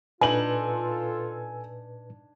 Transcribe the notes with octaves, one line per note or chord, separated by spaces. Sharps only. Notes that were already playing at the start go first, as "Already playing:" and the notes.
A#2 D4 D#4 F4 A4 B4 G#5 F#7